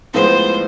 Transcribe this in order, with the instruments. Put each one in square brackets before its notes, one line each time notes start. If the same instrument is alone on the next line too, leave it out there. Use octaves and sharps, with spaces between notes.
[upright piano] A2 F3 G#3 B3 D#4 [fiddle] C5